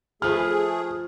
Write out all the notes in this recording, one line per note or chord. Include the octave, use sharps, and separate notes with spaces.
F3 A3 G#4 B4 F6